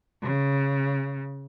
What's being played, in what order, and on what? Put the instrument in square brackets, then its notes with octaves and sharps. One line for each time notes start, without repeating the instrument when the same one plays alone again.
[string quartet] C#3